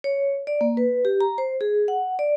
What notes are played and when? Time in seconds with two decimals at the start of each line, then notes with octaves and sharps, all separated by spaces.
0.04 C#5
0.47 D5
0.61 A#3
0.77 B4
1.05 G4
1.21 A#5
1.38 C5
1.61 G#4
1.88 F#5
2.19 D5